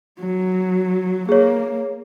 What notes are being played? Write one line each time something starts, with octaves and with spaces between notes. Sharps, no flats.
F#3
A#3 G#4 C#5